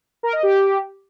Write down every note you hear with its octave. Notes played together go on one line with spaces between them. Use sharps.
A#4
D#5
G4